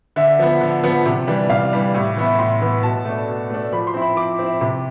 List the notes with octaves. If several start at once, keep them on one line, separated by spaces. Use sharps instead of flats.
D3 E5
F3 B3
D3
F3 B3
C3
E3 G3 D4
C3 F5
E3 G3 D4
A2
E3 B3 E4
A2 C6
E3 B3 E4
B2 A5
A3 D4
B2
A3 D4
F3 B5
C6
C4 E4
B5
F3 D6
C4 E4
C3